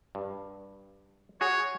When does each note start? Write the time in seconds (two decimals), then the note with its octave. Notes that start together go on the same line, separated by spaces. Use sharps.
0.15 G2
1.41 F#4 G#4 C#5